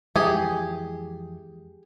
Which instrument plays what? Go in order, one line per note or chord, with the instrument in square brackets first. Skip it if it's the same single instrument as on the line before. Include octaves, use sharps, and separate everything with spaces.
[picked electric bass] F2 E3 G#3 [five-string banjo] G4 G#4